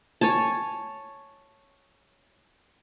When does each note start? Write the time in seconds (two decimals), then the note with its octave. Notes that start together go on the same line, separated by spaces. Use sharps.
0.21 C#5 G#5 A5